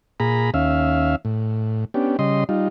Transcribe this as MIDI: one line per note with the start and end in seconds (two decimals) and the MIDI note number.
0.20 0.50 46
0.20 0.50 68
0.20 0.50 82
0.20 0.50 83
0.54 1.16 39
0.54 1.16 61
0.54 1.16 76
0.54 1.16 77
1.25 1.85 45
1.94 2.17 59
1.94 2.17 61
1.94 2.17 62
1.94 2.17 67
2.19 2.44 49
2.19 2.44 55
2.19 2.44 75
2.19 2.44 84
2.49 2.68 55
2.49 2.68 63
2.49 2.68 65